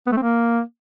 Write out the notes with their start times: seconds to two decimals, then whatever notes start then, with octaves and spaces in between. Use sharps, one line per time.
0.07 B3
0.12 A3
0.17 C4
0.22 A#3